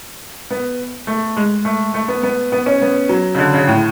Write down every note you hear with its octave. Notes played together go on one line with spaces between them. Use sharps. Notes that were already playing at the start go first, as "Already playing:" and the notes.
B3
A3
G#3
A3
A3
B3
B3
B3
C#4
B3
F#3
C#3
D3
C#3
A2